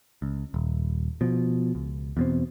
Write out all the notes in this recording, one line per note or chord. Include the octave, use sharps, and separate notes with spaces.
C#2
D#1
B2 F3
C#2
E2 B2 C4